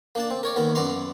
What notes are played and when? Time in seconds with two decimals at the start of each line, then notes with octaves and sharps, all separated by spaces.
0.15 A#3 D4 A5
0.31 C4
0.43 A#4 C#5 D5
0.56 D#2 B3 A#4
0.75 F#2 B3 D5 A#5 C6